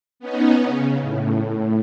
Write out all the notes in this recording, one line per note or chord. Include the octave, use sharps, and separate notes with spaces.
B3 C#4 D#4
C#3
A2